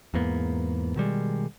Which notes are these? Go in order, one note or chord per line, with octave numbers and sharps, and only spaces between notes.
E2 G#2 A#3 B3
B2 D#3 G3 G#3